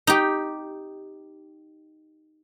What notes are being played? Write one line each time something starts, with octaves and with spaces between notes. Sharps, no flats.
D#4 G4